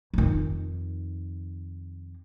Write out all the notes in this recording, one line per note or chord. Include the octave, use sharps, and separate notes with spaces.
F2 D#3